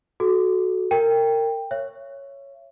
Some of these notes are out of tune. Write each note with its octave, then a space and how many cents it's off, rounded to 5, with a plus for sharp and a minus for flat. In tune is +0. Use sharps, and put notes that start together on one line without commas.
F#4 +0 A4 -25
A#4 -30 G5 +10
C#5 +0 E5 +35